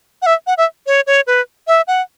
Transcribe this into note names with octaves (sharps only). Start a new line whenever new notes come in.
F#5
E5
F#5
E5
C#5
C#5
B4
E5
F#5